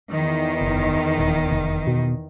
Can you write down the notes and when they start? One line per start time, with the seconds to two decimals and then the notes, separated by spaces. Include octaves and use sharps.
0.11 E2 D#3
0.61 F#1
1.18 D#1
1.50 F1
1.87 B2